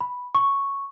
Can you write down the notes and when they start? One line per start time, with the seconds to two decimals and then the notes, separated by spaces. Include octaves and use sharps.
0.01 B5
0.35 C#6